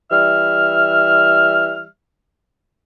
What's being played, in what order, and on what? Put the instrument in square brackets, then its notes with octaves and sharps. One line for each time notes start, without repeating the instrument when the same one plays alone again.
[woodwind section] E3 G3 E5 F6